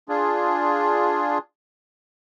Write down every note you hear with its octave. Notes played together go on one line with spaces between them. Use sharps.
D4 F4 G#4